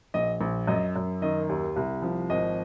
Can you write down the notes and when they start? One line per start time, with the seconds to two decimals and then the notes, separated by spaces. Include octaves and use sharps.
0.14 A#1 D#5
0.41 A#1
0.67 F#2 D#5
0.96 F#2
1.22 D#3 D#5
1.49 D#2
1.76 C2
2.02 F3
2.30 G#1 D#5